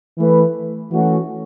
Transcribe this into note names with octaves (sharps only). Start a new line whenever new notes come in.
E3 A3 E4 B4
E3 A3 C#4 F#4